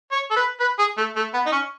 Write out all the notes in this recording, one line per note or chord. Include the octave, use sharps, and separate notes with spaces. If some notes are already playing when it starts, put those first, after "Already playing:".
C#5
A4
B4
B4
G#4
A3
A3
B3
D#4
C#4